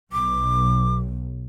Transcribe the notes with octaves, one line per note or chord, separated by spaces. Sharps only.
B1 D6